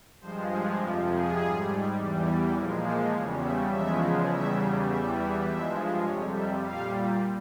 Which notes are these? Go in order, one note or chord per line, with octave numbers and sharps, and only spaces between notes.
G2 F3 G#3 C5
G#4
F2 C3 F3 G4
G#4
G#2 G3
E2 E3 G3
A#2 F3 G#3 A#4
C5
E2 C#3 G3 C#5
E5
E2 C#3 F3 G#3 E5
E2 C#3 G3 E5
E2 E3 G3 E5
E5
G2 F3 G#3 E5
F2 C3 G3 C#5
E5
A#2 G3 F5